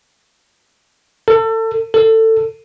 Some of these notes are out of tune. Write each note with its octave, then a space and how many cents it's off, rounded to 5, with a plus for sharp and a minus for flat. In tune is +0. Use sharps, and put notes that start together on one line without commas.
A4 +30
A4 +20